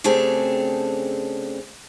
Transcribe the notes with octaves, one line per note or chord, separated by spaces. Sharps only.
C#3 A3 C4 D4 G4 G#4